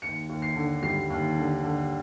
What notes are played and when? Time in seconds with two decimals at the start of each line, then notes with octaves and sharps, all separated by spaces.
0.02 D#2 C#7
0.29 D#2
0.42 C7
0.56 D3
0.82 G3 C7
1.10 D#2
1.37 D3
1.63 D3